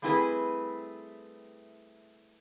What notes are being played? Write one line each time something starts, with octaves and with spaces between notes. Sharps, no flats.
G3 A3 C4 E4 G#4 B4